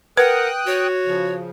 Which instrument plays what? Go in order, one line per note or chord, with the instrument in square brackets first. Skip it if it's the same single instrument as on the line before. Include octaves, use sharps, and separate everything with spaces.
[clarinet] A#4 [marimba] B4 [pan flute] F#5 [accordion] G5 D#6 F#6
[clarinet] F#4 [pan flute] C#5
[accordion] C#3 F3